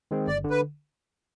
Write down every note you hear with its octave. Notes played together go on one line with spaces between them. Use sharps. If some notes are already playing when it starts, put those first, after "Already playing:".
D#3 G#3 C4
G1 D5
D3
B4